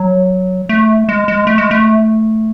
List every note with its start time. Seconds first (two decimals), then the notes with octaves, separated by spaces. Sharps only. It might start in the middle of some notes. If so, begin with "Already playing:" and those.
Already playing: F#3
0.69 A3
1.09 G#3
1.28 G#3
1.47 A3
1.58 G#3
1.71 A3